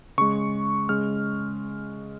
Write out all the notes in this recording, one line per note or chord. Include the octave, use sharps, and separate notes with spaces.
C#3 G#3 C#6
C#3 G#3 F6